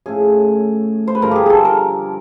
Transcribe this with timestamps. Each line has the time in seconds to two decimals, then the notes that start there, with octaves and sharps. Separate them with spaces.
0.06 A2 F3 A3 C#4 G#4
1.08 C5
1.15 B4
1.22 G2 D3 F3 A#4
1.31 G4 G#4
1.46 G#4 A4
1.65 A#4